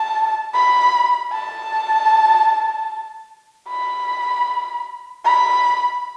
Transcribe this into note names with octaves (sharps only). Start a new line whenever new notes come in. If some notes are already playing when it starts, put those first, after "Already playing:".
Already playing: A5
B5
A5
B5
B5